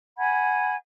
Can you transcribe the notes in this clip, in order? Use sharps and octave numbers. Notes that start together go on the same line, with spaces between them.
F#5 G#5 B5 G#6